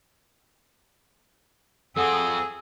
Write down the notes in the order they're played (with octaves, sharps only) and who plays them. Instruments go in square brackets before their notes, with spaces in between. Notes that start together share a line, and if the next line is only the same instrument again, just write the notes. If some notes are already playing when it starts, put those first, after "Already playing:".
[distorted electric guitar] F2 C4 [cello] G#4 [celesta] A4 F#5 D#6 [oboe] E6